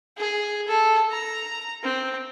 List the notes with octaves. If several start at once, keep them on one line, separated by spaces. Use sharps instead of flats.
G#4
A4
A#5
C4